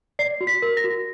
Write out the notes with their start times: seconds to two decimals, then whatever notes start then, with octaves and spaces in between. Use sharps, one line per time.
0.19 D5 C7
0.41 F#4
0.47 B6
0.62 A#4
0.77 A#6
0.84 F#4